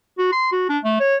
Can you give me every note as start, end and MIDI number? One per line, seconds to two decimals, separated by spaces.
0.18 0.31 66
0.32 0.49 84
0.52 0.67 66
0.69 0.78 62
0.84 0.95 57
1.00 1.16 73